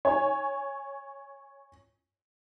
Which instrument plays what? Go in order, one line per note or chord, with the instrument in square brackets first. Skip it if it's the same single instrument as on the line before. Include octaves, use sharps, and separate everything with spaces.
[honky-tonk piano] C#5 G#5